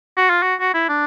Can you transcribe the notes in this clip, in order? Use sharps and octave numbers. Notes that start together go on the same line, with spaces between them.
F#4
F4
F#4
F#4
E4
D4